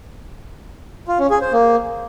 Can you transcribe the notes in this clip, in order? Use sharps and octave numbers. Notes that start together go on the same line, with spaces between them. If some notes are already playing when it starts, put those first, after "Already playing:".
F4
C#4
G#4
C5
A#3